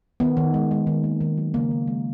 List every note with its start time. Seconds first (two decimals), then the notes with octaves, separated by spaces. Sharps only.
0.20 D#3 B3
0.37 D#3
0.54 G#3
0.71 G#3
0.87 D#3
1.04 A#3
1.21 D#3
1.38 F#3
1.54 C#3 A#3
1.71 C#3
1.87 G#3